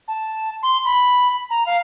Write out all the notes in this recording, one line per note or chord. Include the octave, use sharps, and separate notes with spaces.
A5
C6
B5
A#5
F5